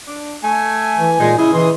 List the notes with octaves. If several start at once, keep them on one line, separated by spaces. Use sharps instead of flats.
D4
A3 G#5
E3
A#2 G#3 D#4
C#3 E4 G#4 D#5
E3 C6 D#6